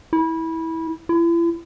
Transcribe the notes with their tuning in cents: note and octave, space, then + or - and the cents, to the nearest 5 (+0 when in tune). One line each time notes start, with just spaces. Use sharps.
E4 -20
E4 +40